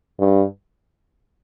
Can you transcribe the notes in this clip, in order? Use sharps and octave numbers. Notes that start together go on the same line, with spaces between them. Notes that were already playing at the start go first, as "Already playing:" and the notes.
G2